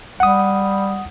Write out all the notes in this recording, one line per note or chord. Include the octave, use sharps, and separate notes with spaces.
G3 F#5 D#6